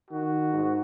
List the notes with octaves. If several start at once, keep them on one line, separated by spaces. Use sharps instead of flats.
D#3 F#4
G#2